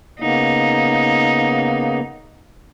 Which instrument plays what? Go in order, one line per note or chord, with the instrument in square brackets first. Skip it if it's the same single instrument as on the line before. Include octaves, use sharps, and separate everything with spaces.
[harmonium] C#3 A#3 B3 [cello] D#4